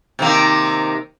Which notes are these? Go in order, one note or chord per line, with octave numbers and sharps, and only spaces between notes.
C3 D#3 A#3